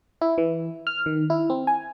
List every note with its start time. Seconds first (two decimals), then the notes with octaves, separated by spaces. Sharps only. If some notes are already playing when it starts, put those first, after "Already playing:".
0.21 E4
0.38 E3
0.87 F6
1.06 D#3
1.30 E4
1.50 C4
1.67 G#5